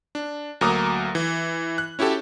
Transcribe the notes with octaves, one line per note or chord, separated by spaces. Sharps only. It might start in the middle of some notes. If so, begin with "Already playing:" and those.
D4
D2 F#3 A#3 A#5 D6 D#6
E3
F#6
C#4 E4 F#4 G4 A4